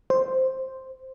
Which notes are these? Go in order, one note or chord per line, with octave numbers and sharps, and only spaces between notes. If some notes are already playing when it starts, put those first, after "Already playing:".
C5